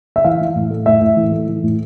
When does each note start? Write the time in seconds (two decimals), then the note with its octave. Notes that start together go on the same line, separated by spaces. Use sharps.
0.16 E5
0.25 E3 F5
0.41 E3
0.55 A2
0.71 A3
0.86 A2 E5
1.01 A2
1.17 E3
1.32 A3
1.48 E3
1.63 A2